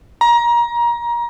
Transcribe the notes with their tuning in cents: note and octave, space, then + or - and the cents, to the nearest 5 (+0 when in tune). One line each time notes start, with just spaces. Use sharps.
A#5 +25